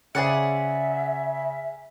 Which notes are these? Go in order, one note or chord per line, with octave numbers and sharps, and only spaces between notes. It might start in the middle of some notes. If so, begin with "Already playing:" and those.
C#3 G#4 C5 D5 E5 F#5